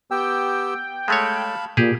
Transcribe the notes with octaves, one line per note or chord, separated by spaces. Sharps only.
B3 G4 G5 E6
G#3 A3 C#5 F5 A5 B5
A#2 G4 G#4